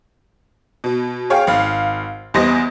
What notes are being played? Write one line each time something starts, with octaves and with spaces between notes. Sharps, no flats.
B2
G#4 C#5 F5 G5
G#1 F5
E2 G3 B3 C5 D#5 A#6